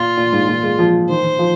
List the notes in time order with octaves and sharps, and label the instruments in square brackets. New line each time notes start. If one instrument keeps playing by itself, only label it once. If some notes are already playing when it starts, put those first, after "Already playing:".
Already playing: [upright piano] A#2 [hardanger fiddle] F4
[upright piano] A#2
G#2
A#2
G#3
F3
[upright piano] D#3 [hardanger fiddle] C5
[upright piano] D#3
F3